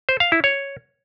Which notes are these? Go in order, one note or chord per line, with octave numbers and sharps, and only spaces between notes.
C5
F5
E4
C#5